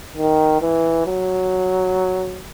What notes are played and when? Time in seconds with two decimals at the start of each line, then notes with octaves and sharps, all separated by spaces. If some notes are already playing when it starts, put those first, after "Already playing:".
0.17 D#3
0.61 E3
1.06 F#3